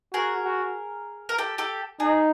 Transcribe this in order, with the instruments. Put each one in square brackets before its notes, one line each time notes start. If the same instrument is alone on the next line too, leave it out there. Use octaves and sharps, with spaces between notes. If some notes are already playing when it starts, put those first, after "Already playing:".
[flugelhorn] F#4 [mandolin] G#4 A#4
[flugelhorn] F#4
[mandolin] A#4
G4 A4
G4 A4
[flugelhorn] D#4 [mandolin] G#4